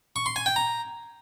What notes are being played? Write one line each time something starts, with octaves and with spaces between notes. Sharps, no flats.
C#6
C6
G#5
G5
A#5